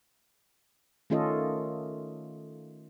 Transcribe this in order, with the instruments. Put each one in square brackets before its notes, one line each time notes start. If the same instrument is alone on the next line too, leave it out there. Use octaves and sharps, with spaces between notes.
[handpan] D#3 A3 C#4 F4 A4 D#5